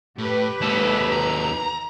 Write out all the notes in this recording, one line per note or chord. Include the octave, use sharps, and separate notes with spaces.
A2 G4 B4
D#2 G#2 A4
A#5